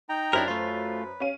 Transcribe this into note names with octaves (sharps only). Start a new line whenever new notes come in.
D#4 G5 A#5
F#2 D4 E4 A#4 C5 F7
A3 F4 B4
C#4 F5 D#7